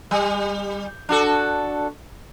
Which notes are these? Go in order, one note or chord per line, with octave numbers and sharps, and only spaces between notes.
G3
D4 F#4 A4